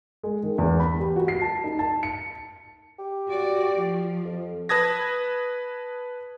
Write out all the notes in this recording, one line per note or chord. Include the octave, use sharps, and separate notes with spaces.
G#3
D#3
E2
B5
G4
F#4
C7
A5
D#4
A5
C#7
G4
F#4 D5
F3
F2
B4 A5 D#6 G#6 A#6